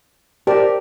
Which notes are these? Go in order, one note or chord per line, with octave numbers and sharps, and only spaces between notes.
G4 A#4 C5 D5 A5